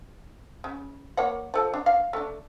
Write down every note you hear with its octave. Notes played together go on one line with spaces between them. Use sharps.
C#3
A#3 C#5 F#5
F3 A4 A5
D4
F5
A3 D4